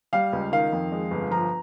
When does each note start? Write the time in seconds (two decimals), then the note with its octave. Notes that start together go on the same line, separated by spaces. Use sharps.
0.13 G3 F5
0.33 C#2
0.52 D#3 F5
0.72 F2
0.92 G#3
1.11 G1
1.31 F3 A#5